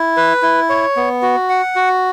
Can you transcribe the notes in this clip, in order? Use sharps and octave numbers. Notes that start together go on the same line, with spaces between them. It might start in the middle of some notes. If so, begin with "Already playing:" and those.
Already playing: E4
B4
E4
C#5
B3
F#4
F#5
F#4